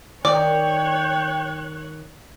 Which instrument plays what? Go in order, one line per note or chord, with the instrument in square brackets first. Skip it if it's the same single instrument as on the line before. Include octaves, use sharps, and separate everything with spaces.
[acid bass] D#3 [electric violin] C#5 F#6 [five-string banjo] D5 [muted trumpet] G5